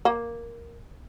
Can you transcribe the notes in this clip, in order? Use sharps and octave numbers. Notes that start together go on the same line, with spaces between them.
A#3